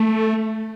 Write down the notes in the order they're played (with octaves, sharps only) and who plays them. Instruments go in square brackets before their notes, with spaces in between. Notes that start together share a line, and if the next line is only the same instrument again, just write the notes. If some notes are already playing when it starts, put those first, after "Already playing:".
Already playing: [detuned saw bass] A3